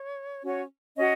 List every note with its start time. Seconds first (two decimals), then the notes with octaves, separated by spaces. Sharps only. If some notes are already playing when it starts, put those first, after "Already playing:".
Already playing: C#5
0.43 C#4 F#4 C#5
0.96 C#4 F#4 C#5 D#5